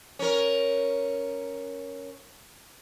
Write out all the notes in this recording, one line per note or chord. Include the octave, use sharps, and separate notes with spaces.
C#4 A#4